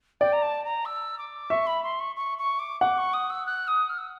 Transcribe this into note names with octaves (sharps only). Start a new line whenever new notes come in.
D5 G5
A#5
A5
A#5
E6
D6
E5 C#6
B5
C6
C#6
C#6
C#6
D6
F#5 D6
C#6
D#6
E6
F#6
D#6
F6
E6